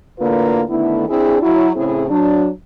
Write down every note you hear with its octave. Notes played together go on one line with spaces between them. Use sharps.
E2 A2 D3 A#3 F4 B4
D3 D#3 A3 B3 E4
C4 D4 E4 G#4
F#3 E4
A2 C#3 C4 E4 G#4
F#3 D4